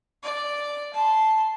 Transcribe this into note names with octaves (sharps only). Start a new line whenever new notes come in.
D5
A5 C6